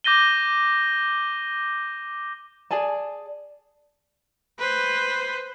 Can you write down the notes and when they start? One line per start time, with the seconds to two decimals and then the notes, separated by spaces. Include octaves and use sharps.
0.04 D6 G6 A#6 D#7 G7
2.71 G#4 D5 G#5 A5
4.59 B4 C5